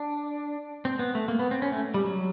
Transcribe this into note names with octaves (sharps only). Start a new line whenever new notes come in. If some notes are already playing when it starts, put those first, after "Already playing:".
Already playing: D4
C4
B3
A3
A#3
B3
C4
C#4
A3
G3
F#3